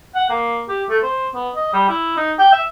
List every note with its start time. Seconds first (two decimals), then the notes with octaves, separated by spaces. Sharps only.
0.15 F#5
0.30 A#3
0.69 G4
0.89 A3
1.03 C5
1.35 B3
1.55 D#5
1.73 G3
1.89 E4
2.17 D#4
2.39 G5
2.52 E5